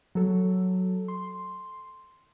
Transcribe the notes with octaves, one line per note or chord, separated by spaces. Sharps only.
F#3 A4
C6